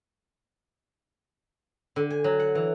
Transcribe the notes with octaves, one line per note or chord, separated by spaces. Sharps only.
D3
G#5
F#3
F#5
E3